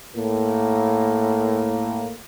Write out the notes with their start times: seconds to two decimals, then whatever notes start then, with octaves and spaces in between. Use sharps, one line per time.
0.16 A2 A#3